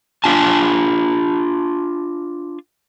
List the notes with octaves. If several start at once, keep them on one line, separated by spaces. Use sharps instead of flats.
D4 F4 G#5 A5